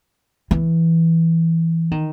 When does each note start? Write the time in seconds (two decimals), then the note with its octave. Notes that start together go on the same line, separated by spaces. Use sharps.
0.51 E3
1.91 D#3